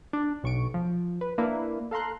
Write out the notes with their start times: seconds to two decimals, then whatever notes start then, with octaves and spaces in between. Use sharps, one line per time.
0.13 D4
0.43 B1 C#6 D7
0.74 F3
1.21 B4
1.38 A#3 D4 E4 B4
1.91 A4 F5 A#5 C6 F#6